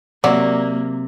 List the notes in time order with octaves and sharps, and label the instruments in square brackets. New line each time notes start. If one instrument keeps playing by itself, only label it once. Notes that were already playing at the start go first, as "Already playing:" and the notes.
[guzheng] C3 [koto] F#3 [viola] A#3 [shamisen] D5